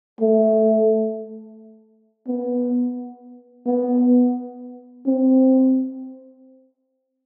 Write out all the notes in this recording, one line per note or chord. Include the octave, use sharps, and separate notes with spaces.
A3
B3
B3
C4